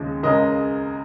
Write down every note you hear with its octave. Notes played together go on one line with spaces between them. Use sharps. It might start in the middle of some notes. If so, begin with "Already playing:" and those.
Already playing: D#2 C#3 F3 G#3
C#2 C#3 G#3 A#4 D#5